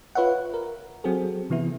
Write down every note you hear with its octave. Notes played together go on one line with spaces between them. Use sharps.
F4 B4 C#5 E5 F#5
A#4
F#3 C4 F#4 G#4 A4
C3 E3 B3 E4